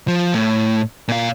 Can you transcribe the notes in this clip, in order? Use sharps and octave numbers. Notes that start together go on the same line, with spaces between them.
F3
A2
A#2 F5